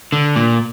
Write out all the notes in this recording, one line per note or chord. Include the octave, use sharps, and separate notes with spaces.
D3
A#2